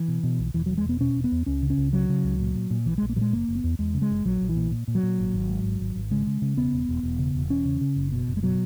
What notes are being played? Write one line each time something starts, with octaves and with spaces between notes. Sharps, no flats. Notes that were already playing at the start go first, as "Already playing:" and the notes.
Already playing: E3
B2
B2
B1
E1 E3
E2 F#3
G#3
E1 B3
B2 C#4
E1
B3
E2
C#2 C#4
C#3
C#4
C#2
C#3 F#3
C#3
C#2
A#2
A#2
A#2
A#1 E3
A#1 G#3
A#3
A#2 F#3 G#3
F#1 A#3
F#1
B3
E2
E2 G#3
C#3
G#3
F#1
A#1 F#3
A#1
E3
A#2
A#2
A#2
F#3
A#2
G#1
G#1
G#2
G#1
G#1
G#1
C#3 G#3
C#3
C#3
E1 B3
E1
E1
E1
C#3
E1
E2 C#4
C#3
C#3
F#1
B2
F#1
G#3
B2 F#3